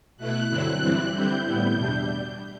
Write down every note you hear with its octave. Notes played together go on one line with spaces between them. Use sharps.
B2 A3 E4 F#6
G2 D3 F#3 C4 E4 F#6
G2 E3 G3 C4 E4 F#6
D3 G3 C4 E4 G6
A2 G3 B3 E4 G6
E2 B2 G3 D4